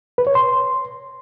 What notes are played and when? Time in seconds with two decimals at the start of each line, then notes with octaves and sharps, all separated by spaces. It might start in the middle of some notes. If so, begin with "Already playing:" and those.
0.18 B4
0.27 C#5
0.35 C6